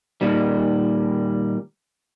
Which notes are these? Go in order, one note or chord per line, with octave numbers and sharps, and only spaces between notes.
A#2 D#3 G3